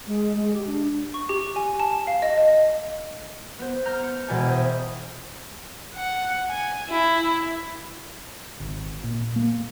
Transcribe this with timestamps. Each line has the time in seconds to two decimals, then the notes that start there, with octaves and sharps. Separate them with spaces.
0.07 G#3
0.37 G#3
0.53 G4
0.67 D4
1.14 C#6
1.29 G4
1.56 G#5
1.80 A5
2.07 F5
2.22 D#5
2.38 D#5
3.59 B3 C5
3.85 A#5 F6 G6
4.03 C#7
4.28 E1 B2 E4 D5 G5 G#5
4.49 C5 B5 D#6
5.94 F#5
6.49 G#5
6.89 E4
8.60 G#1
9.03 A#2
9.36 A#3